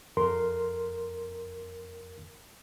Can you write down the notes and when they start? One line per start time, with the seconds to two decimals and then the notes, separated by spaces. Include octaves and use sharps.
0.17 F2 A#4 C6